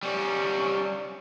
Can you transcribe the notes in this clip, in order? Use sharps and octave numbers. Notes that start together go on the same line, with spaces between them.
G3 C#4